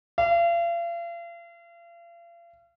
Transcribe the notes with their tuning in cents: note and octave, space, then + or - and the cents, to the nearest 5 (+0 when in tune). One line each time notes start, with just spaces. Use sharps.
F5 -40